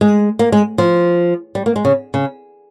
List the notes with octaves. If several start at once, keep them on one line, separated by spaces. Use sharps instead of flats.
G#3
A#3
G#3
F3
G3
A#3
G#3
C#3
C#3